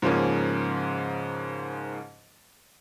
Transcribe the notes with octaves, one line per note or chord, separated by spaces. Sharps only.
G#2 C#3 F3 A#3 C#4